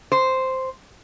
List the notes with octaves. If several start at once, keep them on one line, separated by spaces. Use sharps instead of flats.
C5